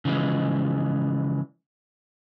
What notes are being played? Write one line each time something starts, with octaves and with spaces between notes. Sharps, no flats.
C#3 E3 F3 G#3